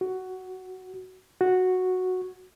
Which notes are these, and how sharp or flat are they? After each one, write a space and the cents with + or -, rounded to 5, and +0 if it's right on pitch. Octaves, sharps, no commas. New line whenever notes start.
F#4 +10
F#4 -5